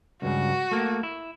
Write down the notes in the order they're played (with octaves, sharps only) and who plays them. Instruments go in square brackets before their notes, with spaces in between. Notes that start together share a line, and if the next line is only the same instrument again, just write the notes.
[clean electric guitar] C#2 G2 C#3 [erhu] F#4
[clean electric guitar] A3 A#3
E4